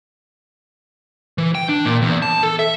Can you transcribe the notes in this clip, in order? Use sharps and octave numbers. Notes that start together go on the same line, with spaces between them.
E3
G5
D4
A#2
E2
A5
A4
E5